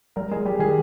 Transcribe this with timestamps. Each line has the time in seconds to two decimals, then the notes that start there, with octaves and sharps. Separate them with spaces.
0.16 G3 A#4
0.31 G#3 G#4
0.45 G3 G4
0.59 D#3 G#4